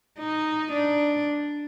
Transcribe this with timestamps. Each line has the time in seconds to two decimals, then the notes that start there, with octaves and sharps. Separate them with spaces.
0.19 D#4
0.73 D4